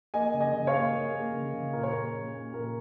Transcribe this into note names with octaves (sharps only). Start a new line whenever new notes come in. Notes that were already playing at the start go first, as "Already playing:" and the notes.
A#3 D#5 G#5
C#3
D#5 G#5
C#3
C#5 F5
A#3
A#3
A#3
C#3
C#3
A#2 A#4
C#5
A#2 A#4
A#2
A#3
A#2 A#4